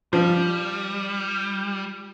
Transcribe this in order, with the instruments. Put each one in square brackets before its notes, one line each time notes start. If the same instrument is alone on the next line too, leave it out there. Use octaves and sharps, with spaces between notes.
[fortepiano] F3 [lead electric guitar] G3